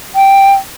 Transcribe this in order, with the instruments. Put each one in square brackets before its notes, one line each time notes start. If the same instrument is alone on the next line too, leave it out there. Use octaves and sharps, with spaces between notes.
[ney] G5